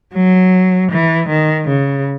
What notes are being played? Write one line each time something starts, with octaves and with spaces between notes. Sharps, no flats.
F#3
E3
D#3
C#3